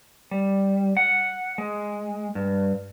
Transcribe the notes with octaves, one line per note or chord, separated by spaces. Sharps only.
G3
F#5
G#3
G2